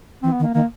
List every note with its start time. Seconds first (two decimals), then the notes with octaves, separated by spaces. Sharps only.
0.23 E3 C4
0.33 B3
0.39 D#3
0.43 A#3
0.54 D#3 A#3